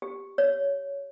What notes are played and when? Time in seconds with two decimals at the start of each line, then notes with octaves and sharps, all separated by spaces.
0.02 G4
0.38 C#5